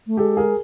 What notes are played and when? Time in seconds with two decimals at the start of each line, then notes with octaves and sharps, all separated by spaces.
0.07 A3
0.17 G#3 G4 A4
0.37 G#4 A#4